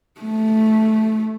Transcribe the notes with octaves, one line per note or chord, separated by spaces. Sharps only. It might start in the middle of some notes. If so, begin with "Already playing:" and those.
A3